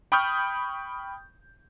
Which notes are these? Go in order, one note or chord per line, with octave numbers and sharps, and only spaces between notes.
G5 B5 C#6 D#6 F6 G6